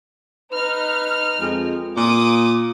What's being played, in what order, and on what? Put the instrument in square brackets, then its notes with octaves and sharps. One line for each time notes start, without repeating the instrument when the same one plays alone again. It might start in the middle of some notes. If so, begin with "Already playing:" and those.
[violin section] D#4 F6 [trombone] B4
[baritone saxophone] F2 [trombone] G#3
[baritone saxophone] A#2 [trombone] A#3 [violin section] D6 D#6